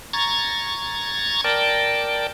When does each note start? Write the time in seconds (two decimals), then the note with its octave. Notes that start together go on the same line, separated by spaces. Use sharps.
0.13 A#5 C#6 G#6 A6
1.44 A#4 D5 G5 A5